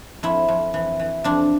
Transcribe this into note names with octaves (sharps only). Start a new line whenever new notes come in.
F2 E4
F2
E3
E3
F2 D4